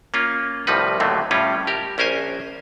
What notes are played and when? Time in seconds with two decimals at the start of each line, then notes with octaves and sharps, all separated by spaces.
0.14 A#3 C#4 F4
0.67 C2 A2 F3 G3 D#4 B4
1.00 D#2 A2 D3 F#3 A3 C4
1.31 A2 G3 C#4 F4
1.67 G4 A#4
1.98 A#1 C#4 A#4 C5 G#5